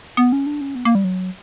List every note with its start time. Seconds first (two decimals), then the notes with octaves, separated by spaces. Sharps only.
0.17 B3
0.32 C#4
0.46 D4
0.61 C#4
0.75 B3
0.85 A#3
0.95 G3
1.04 F#3